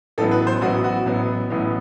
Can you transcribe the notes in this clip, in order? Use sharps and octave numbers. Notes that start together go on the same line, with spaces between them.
A1 A2 F#3 B3 A4
B4
C5
A1 A2 F#3 B3 F#4
F#4
A1 A2 F#3 B3
A1 A2 F#3 B3